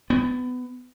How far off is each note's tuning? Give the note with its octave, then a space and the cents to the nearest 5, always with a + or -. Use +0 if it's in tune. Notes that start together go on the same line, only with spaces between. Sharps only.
B3 +20